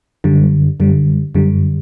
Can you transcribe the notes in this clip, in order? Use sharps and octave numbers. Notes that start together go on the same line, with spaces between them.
F#2 D3 G3
F#2 D3 G3
F#2 D3 G3